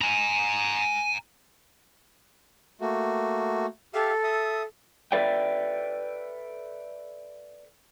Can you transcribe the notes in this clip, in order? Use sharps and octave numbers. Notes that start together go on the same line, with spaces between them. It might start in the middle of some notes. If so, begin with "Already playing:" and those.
G#5 A#5
A3 A#3 F#4
G4 A4 E5 F5
E5 D#6
A4 B4 D5 E5 G5